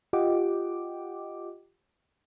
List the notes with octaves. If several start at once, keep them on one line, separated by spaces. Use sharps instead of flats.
F4 G4 D#5 F#5 G5 D6